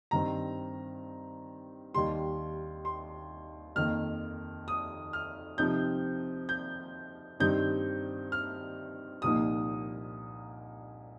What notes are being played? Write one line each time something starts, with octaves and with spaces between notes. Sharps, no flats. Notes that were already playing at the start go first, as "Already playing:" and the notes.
G2 D#3 C4 A#5
D#2 D#3 G3 C6
C6
F2 D#3 A#3 F6
D#6
F6
C3 F3 C4 D#4 G6
G6
G2 D#3 G3 C4 D#4 G6
F6
C2 A#2 F3 A#3 D#4 D#6